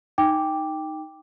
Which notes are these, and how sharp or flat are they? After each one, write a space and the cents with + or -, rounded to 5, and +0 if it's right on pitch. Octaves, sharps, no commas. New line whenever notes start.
D#4 +0 G5 +10 D6 +0